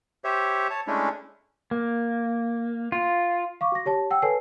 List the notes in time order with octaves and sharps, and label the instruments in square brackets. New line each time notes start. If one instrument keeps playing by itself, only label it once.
[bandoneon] G4 C5 C#5 E5
C#5 A5
G#3 A3 C#4 D4 E4
[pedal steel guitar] A#3
F4
[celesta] F5 C#6 D6
F#4 A#6
G4 C#5 A5
F#5 G5 E6
A4 B4 C#5 G#5 A5 C7